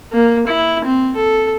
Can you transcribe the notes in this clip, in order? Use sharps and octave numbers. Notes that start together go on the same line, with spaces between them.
A#3
E4
C4
A4